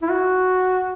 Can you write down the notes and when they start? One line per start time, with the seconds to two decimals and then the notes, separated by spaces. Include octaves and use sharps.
0.02 E4
0.10 F#4